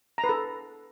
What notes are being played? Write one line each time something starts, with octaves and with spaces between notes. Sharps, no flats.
A#5
B4
A4